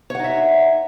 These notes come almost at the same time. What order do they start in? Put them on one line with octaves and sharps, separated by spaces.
C#5 F#5 D#4 E5